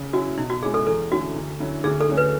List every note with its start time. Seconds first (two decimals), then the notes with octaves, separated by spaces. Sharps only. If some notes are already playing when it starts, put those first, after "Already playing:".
Already playing: C#3
0.13 F#3 C#4 E4 F#4
0.38 B2 E4
0.50 F#4
0.62 G#3 C#4 E4 G#4
0.74 A4
0.87 E2 A4
1.11 D3 A3 C#4 E4 F#4
1.35 D2
1.60 D3 F#3 C#4 E4
1.84 D2 G#4
2.00 A4
2.09 D3 F#3 A3 C#4
2.17 B4